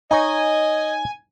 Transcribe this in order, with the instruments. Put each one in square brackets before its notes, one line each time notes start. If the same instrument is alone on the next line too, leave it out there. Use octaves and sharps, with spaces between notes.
[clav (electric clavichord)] D#4 C#5 [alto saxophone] D#5 [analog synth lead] G#5